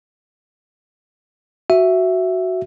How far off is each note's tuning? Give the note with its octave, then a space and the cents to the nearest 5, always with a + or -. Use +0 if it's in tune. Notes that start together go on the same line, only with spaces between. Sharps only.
F#4 +5 E5 +5